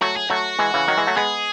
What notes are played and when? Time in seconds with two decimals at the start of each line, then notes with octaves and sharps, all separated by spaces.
0.01 F#3 A3 F#4
0.16 G#4
0.30 F#3 A3 F#4
0.59 E3 G#3
0.74 C#3 E3
0.88 D#3 F#3
0.97 E3 G#3
1.07 F#3 A3
1.16 G#3 B3 G#4